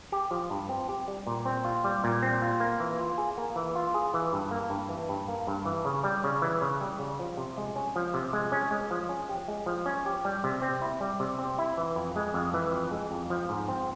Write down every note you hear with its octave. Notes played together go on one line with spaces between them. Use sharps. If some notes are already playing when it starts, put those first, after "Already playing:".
G4
F3
G2
C4
G4
G3
A#2
C4
F4
G3
A#2
C4
F4
A#3
E3
F4
G#4
A#3
E3
F4
G#4
E3
G2
A#3
G2
E3
G2
A#3
G2
E3
C#3
G3
C#3
E3
C#3
G3
C#3
F3
C3
G#3
C#4
F3
C3
G#3
C#4
G#3
F3
C#4
G4
G#3
F3
C#4
G4
G3
C3
C4
E4
G3
C3
C4
E4
E3
F2
G#3
F2
E3
F2
G#3
F2
F3
G#2
C4